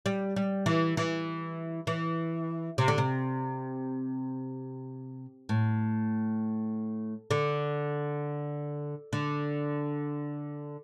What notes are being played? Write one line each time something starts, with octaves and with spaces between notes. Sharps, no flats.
G3
G3
E3
E3
E3
C3
D3
C3
A2
D3
D3